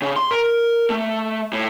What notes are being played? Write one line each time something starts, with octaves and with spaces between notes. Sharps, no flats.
C#3
C6
A#4
A3
A2